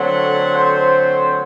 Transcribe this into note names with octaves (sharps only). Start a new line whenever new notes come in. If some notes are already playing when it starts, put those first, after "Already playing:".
Already playing: D3 F#3 A3 C4 F#5
C5